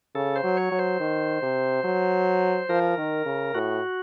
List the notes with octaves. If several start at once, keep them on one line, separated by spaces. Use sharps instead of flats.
C#3 A4
C5
F#3
C#5
F#3
C5
D#3
C3
F#3
F3 A#4
D#3
C#3
A2 F#4